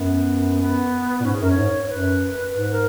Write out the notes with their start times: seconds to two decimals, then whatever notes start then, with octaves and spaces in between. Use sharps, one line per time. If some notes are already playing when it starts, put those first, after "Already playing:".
Already playing: F#2 B3
0.60 B3
1.20 A#2
1.24 G#2 C#4
1.33 G#4
1.41 F#2 A#4
1.50 C#5
1.57 G#2
1.85 C#5
1.90 F#2 B4
2.55 G#2 B4
2.72 A#4